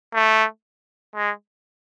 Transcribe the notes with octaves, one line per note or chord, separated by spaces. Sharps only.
A3
G#3